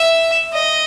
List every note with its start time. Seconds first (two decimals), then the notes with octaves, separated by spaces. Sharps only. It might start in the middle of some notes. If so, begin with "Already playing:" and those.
Already playing: E5
0.53 D#5